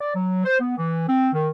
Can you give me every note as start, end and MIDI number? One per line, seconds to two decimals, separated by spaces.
0.01 0.14 74
0.15 0.42 54
0.45 0.60 72
0.60 0.73 59
0.77 1.07 52
1.08 1.28 60
1.33 1.49 51